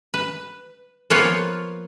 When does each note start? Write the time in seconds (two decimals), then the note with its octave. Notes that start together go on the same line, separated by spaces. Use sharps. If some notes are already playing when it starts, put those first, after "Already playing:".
0.14 B4
1.10 F3 A#3 B3 F4 B4 C#5